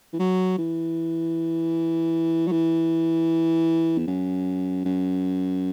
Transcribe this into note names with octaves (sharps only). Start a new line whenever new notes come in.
E3
F#3
E3
F#3
E3
E2
F#2
F#2